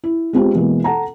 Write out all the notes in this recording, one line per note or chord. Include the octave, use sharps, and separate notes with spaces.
E4
G#3 B3 C4 F4 G4
B2 E3 G#3 A#3
A4 F#5 A5 A#5